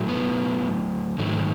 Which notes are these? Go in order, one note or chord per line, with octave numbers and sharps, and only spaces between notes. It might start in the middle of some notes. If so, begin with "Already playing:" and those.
Already playing: A2 F#3 A3
B3
G#2 D#3 F#3 A3